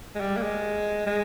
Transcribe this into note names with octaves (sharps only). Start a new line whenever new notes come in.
G#3
G3
A#3
G#3
G#3